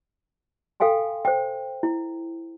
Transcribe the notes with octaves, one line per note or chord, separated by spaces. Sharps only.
A4 F5 G5 G#5 C6
C5 G5
E4